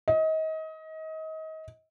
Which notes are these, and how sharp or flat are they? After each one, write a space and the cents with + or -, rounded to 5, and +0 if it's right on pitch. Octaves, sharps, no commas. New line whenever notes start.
D#5 +30